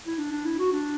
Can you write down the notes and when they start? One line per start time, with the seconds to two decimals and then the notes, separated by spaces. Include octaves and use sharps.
0.06 E4
0.18 D4
0.32 D4
0.45 E4
0.59 F#4
0.73 D4